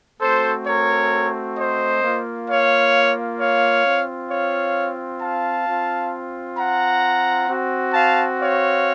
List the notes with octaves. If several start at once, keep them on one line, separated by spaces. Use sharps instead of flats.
A3 C4 F#4 A4 C5
A#4 C#5
C5 D#5
A#3 F4
C#5 F5
C#5 F5
C4 F4
C#5 F5
F5 A5
C4 F4
F#5 A#5
C4 F#4
F5 A5
C#5 F5